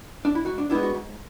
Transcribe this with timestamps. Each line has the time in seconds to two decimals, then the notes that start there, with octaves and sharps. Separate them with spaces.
0.25 D4
0.35 E4
0.45 G#2 F#4
0.58 D4
0.70 G#3 B3 D4 E4
0.83 F#4
0.94 G#2